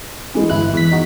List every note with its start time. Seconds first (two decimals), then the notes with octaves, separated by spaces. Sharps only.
0.34 E3 G#3
0.50 G1 E4 F#6
0.74 E2 B6
0.92 D#4 F#4